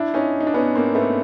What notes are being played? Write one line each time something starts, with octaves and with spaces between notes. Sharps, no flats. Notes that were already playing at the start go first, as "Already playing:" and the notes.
Already playing: D4 E4
C#4 D#4
D#4
D4
B3 C#4
A#3 C4
A3 B3